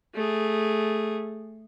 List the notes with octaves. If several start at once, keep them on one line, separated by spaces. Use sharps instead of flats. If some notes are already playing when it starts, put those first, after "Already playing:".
A3 G#4